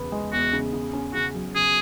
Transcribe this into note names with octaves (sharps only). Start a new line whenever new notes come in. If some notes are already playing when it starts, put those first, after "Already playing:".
Already playing: E2 C#3 B3
G#3
E2 F#4
C#3
C#3
C#4
C#3 F#4
F#3
C#3 G#4